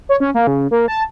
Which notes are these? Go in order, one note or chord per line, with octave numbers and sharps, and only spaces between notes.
C#5
C#4
A#3
C#3
A#3
A5